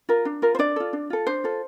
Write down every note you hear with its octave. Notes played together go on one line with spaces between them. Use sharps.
F4 A#4
D4
F4 A#4
C5
D4 D5
F4 A4
D4
F4 A4
D4 C5
F4 A4